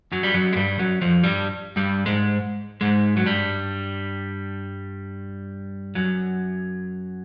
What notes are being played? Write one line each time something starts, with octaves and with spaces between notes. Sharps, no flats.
F#2 F#3
G3
F#2 F#3
G#3
G2 G3
F#2 F#3
F2 F3
G2 G3
G2 G3
G#2 G#3
G#2 G#3
F#3
G2 G3
F#2 F#3